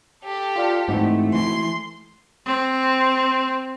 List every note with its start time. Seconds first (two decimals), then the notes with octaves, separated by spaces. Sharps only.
0.23 G4 A4
0.56 F4 D5 F5
0.88 G#2 E3 A3 C4 D#4 F#4
1.34 E3 C6
2.46 C4